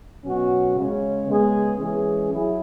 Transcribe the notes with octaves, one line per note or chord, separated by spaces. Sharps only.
B2 F#3 C#4 F#4
C#3 G#3 C#4
C#3 G#3 B3 G#4
E3 G#3 C#4 G#4
F#3 E4 G#4